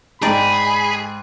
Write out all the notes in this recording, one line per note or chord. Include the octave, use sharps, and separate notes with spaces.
G#2 D#4 G#4 D5 G5 A5 B5